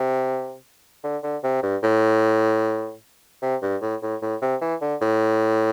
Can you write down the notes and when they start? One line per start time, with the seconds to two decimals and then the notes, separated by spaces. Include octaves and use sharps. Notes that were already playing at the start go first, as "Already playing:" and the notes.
Already playing: C3
1.04 D3
1.23 D3
1.44 C3
1.63 G2
1.83 A2
3.42 C3
3.62 G2
3.82 A2
4.02 A2
4.22 A2
4.42 C3
4.61 E3
4.81 D3
5.01 A2